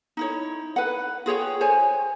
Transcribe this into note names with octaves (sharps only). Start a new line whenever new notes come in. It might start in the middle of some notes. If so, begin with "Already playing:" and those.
D#4 E4 C#5
B4 F#5
F4 G#4 C#5 G5
C5 C#5 G#5